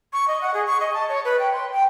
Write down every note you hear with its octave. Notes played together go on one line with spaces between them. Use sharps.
C#6
D#5
F#5
G#4
C#6
D#5
A5
C#5
B4
G5
C6
G5